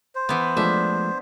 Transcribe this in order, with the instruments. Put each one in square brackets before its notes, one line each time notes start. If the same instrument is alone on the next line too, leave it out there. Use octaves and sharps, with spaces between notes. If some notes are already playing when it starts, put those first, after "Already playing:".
[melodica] C5
[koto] E3 B3
[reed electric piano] F3 G#3 A3 [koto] D4 E5